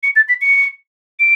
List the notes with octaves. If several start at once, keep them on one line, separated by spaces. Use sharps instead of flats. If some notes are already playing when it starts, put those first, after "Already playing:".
C#7
A6
B6
C#7
D7